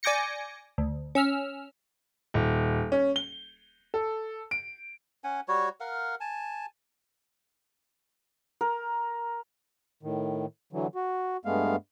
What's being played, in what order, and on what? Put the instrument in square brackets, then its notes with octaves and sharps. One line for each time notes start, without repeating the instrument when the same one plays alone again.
[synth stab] D5 G#5 D6 G6 A#6 C#7
D2
C#4 E6 F6
[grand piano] D#1
C#4
G7
A4
D7
[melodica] C#4 F#5 G#5
G3 F#4 C#5
A#4 F5 F#5
G#5 A5
[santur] A#4
[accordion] A2 D#3
D3 E3 F#3
F#4
G2 G#3 A3 B3 F5